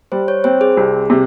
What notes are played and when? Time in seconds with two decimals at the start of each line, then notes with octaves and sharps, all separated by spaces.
0.12 G3 C5
0.28 C#5
0.44 C4 C5
0.61 G#4
0.77 C2
1.10 C3